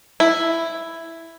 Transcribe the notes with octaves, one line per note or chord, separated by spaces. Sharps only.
E4